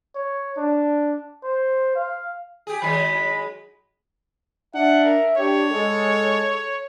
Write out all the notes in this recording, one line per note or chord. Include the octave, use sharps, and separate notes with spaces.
C#5
D4
C5
F5
G4 G#4
D#3 F#3 G#3 B5
D4 E5 F#5
A#4
D4 G4 C#5
G#3 A4